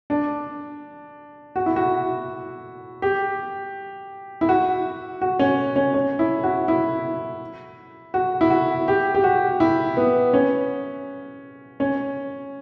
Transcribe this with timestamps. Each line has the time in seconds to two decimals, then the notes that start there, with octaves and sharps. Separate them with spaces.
0.10 D4
1.56 F#4
1.66 E4
1.76 F#4
3.02 G4
4.41 E4
4.49 F#4
5.21 F#4
5.39 C#4
5.76 C#4
5.94 C#4
6.19 E4
6.44 F#4
6.68 E4
8.14 F#4
8.41 E4
8.50 F#4
8.88 G4
9.14 G4
9.24 F#4
9.60 E4
9.97 B3
10.33 C#4
11.80 C#4